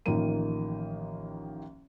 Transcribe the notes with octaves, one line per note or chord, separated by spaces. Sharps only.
A1 D#3 F3 A#3 D#7